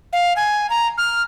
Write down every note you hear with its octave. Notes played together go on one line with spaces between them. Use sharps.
F5
G#5
A#5
F6